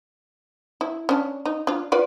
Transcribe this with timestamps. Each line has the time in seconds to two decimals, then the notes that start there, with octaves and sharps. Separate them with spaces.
0.81 E4
1.09 C#4 D4
1.45 D#4
1.67 D4 F4
1.92 F4 B4 D5